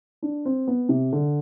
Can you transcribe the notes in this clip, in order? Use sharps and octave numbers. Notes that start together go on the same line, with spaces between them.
D4
C4
B3
C3
D3